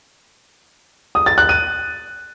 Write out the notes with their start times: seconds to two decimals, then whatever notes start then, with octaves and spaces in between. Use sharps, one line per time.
1.15 D#6
1.26 A6
1.38 F#6
1.49 D#7